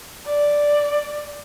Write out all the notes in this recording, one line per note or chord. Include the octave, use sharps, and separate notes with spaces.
D5